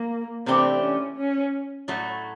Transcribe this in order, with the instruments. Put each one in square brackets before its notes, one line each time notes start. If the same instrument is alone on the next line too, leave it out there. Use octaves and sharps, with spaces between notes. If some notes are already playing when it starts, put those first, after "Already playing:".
Already playing: [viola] A#3
[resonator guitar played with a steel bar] C3 E3 A3 D4 G4 [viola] C4
[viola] C#4
C#4
[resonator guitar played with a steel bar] A2 F#3 A3